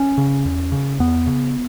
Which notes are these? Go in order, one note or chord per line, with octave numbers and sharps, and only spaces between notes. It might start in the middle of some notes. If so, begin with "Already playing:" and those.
Already playing: C#4
C#3
E2
C#3
E2 B3
C#3